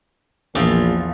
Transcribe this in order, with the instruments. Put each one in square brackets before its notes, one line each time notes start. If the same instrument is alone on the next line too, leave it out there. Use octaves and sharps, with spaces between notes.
[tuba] A#1 [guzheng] E2 F3